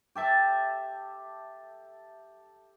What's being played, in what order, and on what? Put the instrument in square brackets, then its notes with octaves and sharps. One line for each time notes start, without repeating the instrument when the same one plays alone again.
[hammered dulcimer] G4 A4 E5 A5